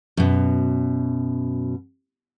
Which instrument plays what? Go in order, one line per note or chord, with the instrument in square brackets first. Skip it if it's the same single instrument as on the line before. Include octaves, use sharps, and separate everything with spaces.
[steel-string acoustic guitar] F#2 B2